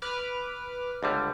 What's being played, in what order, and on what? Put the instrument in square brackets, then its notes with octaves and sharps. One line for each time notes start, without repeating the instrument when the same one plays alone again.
[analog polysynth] B4 D6 F6
[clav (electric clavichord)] C#2 D3 G3